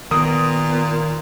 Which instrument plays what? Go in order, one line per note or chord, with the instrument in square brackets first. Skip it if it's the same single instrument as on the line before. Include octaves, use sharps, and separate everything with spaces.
[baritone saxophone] A#2 [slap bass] D#3 [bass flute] B3 [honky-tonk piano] D#6